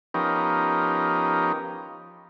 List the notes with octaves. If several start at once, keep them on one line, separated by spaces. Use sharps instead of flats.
F3 B3 C#4 D#4 G4 A#4